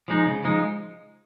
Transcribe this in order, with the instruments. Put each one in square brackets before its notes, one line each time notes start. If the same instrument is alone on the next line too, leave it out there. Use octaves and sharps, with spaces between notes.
[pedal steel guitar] F3 G#3 D#4
C#3
F3 G#3 D#4